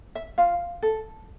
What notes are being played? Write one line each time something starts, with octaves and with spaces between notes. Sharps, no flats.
E5
F4 F5
A4